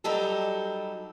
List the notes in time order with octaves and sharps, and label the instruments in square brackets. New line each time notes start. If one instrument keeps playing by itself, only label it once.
[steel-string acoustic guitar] F#3 G3 D#4 G4 A4